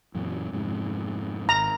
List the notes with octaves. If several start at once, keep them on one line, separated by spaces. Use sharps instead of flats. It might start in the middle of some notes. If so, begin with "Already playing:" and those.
F#2 A#2 E3
F2 G#2 C3
G#1 A#5